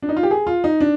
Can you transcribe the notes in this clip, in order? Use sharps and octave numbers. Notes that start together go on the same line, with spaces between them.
D4
D#4
F4
G4
G#4
F4
D#4
D4